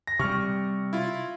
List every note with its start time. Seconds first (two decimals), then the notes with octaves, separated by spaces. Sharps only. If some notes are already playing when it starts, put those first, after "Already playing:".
0.07 A#6
0.19 C3 G3 C#6 F6
0.93 E4 F4